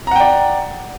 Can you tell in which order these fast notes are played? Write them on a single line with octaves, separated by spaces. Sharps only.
A#5 F#5 G5 D5